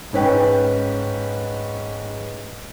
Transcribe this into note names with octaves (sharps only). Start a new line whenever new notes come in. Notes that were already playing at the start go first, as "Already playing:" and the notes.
G#2 C#4 B4 G5